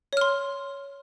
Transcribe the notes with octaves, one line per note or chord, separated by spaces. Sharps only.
C#5 C6 F6